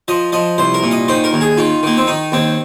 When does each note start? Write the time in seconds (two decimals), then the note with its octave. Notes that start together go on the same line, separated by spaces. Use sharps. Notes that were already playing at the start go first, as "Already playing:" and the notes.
0.08 F3 D#5
0.32 F3 D#5
0.58 C2 C5
0.74 A#4
0.83 A#2
0.91 D#5
1.08 D#3 C5
1.24 A#4
1.33 D#2
1.41 G#4
1.57 D#3 F4
1.83 D#3 A#3
1.97 C4
2.07 D#3 D#4
2.32 D#2 C4